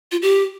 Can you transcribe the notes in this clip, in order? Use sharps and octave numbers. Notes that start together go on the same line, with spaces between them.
F4
G4